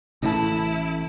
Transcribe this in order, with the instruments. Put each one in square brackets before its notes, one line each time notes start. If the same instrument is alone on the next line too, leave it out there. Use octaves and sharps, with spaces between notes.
[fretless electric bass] A1 C#3 E3 [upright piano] A2 A5 [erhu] E4